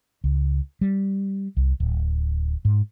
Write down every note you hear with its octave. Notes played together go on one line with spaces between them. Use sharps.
C#2
G3
C2
D1
G#2